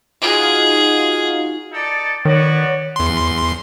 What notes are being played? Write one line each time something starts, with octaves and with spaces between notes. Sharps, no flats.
D#4 F4 F#4 G#4
D#4 A4 D5
D#3 B3 F#4 C#5 D5
E2 C6